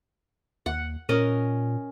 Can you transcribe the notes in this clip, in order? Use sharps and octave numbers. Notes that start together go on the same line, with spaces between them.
D#2 F#5
A#2 C#4 A#4 D#5